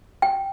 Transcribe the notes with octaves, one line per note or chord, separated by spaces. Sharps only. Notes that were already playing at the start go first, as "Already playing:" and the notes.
G5